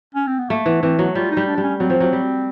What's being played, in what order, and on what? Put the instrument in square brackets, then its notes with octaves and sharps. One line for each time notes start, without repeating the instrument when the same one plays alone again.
[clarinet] C#4
C4
B3
[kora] A3 [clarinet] A#3
[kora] E3 [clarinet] B3
[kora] E3 [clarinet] C4
[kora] F#3 [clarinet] B3
[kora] G3 [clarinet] F4
[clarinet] D#4
[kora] G3
[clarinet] D4
[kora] G3
[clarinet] C#4
[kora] F#3 [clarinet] C4
[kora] F3
F#3
G3